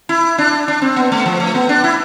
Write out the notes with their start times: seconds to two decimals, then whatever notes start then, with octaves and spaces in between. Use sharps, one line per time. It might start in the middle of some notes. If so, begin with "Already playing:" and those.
0.09 E4
0.38 D4
0.68 D4
0.82 C4
0.96 B3
1.12 A3
1.26 F3
1.40 A3
1.55 B3
1.69 D4
1.84 E4